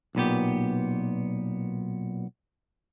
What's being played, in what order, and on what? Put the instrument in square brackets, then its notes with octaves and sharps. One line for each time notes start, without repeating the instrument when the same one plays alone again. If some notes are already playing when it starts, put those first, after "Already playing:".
[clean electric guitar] B1 A#2 B3 G4